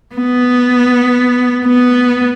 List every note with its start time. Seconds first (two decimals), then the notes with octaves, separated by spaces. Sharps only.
0.15 B3
1.66 B3